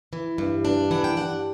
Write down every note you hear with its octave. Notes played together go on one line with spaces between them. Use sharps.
E3
G2
D4
E3 F#5
G5
G2 F#5